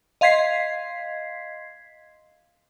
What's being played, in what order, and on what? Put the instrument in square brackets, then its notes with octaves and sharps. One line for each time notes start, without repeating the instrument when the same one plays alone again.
[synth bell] D#5 F5 C6 G#6 B6 C7